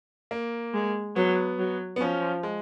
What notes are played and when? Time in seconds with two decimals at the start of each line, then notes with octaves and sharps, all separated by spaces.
0.31 A#3
0.74 G#3
1.16 F#3 B3
1.58 F#3
1.96 B3
2.00 F3 C#4
2.43 G#3